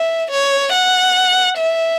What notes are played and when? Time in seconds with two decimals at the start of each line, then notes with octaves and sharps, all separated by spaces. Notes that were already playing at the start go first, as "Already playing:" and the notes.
Already playing: E5
0.31 C#5
0.72 F#5
1.57 E5